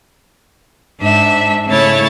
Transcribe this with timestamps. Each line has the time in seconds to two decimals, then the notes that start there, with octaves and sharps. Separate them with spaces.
1.00 G#2 D4 E5
1.67 C#3 A3 E4 C#5 A6